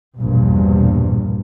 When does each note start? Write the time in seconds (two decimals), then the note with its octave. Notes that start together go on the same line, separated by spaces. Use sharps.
0.18 A#1 E2 G2 B2